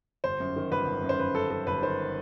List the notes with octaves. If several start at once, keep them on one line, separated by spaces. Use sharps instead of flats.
G1 C5
F#2
D#3
G1 B4
G1
F#2
C5
F#2 B4
F#2 A4
F#2 A4
G1 B4
D#3 C5